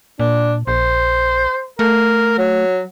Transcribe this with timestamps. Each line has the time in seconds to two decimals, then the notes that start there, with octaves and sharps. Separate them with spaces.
0.19 A#2 D4
0.67 A#1 C5
1.79 A3 A#4
2.38 F#3